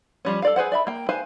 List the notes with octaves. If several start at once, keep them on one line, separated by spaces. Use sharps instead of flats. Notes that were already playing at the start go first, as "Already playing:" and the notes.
F3 G3 C#4
A4 D5 F5
G#4 B4 C5 F#5
D5 E5 B5
A#3 G5
B4 C5 F5 G#5